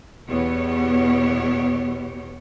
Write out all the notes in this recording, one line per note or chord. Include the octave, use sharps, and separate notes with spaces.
E2 B2 B3 G4 C#5